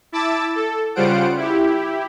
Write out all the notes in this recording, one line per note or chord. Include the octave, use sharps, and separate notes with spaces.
E4 A5 D6 E6 A6
A4
C#3 G3 F4 C5 F#5 D7
E4 G4